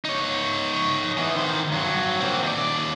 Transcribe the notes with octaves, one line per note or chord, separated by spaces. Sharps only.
D#4 C#5
E3 B3
D#3 C5
G2 F#3
A#3 C4
D#2 D5